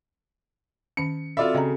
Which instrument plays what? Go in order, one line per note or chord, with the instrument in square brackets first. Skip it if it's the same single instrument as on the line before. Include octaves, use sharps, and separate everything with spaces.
[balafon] D#3 C#4 [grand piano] C#7
[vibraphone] C4 F#4 A4 [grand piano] F4 D5 E5 [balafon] B5
[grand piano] C#3 [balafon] D#5 G5 A#5